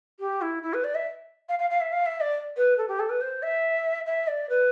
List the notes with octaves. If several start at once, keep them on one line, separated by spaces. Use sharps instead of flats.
G4
E4
E4
B4
D5
E5
F5
F5
F5
E5
F5
E5
D5
B4
A4
G4
A4
B4
C5
E5
E5
D5
B4